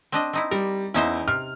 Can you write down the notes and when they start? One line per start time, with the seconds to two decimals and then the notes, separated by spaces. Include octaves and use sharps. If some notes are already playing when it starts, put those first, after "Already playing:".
0.12 C4 D4 D#5
0.33 C4 D#4 E4
0.51 G3 A#4
0.94 E2 C#4 D#4 E4 C5
1.28 C3 F6